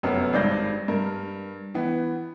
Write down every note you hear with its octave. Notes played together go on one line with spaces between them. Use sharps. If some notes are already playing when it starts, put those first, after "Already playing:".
F1 F#2 B3 C#4 A#4
G#1 G2 D5 G6 A#6
G2 A#4
E3 B3